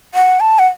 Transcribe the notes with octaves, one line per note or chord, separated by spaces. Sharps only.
F#5
A5
F#5